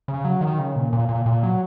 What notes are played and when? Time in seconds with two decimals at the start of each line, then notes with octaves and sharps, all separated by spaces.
0.08 C#3
0.25 F#3
0.41 D#3
0.59 C#3
0.76 A#2
0.93 A#2
1.09 A#2
1.26 A#2
1.43 F#3